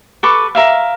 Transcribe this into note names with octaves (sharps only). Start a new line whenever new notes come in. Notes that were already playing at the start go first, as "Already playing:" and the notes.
A4 B4 C#6 D6
A#4 E5 F5